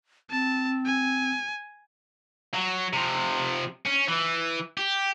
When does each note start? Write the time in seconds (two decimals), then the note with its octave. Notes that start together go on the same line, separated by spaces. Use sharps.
0.31 C4 A5
0.86 G#5
2.54 F#3
2.93 C3 F3
3.86 C#4
4.08 E3
4.77 G4